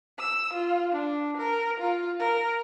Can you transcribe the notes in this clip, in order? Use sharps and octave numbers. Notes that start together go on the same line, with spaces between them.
E6
F4
D4
A#4
F4
A#4